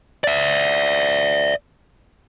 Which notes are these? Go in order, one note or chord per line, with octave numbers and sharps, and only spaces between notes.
D5 E5